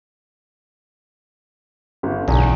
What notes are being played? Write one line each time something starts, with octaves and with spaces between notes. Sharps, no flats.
G1
B1 E2